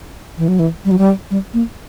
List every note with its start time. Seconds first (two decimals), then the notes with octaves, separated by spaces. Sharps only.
0.38 E3
0.48 F#3
0.59 E3
0.85 G3
0.91 F#3
0.98 G3
1.30 G3
1.54 A#3